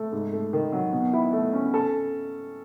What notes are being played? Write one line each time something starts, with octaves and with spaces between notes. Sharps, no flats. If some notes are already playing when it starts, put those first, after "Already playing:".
Already playing: A3
G#2
A3
D#3
F#3
B2
E4
A3
C#4
A4